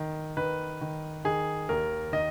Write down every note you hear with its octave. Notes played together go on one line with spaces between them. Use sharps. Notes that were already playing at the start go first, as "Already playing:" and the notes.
Already playing: D#3
D#3 B4
D#3
D#3 G#4
D#2 A#4
D#3 D#5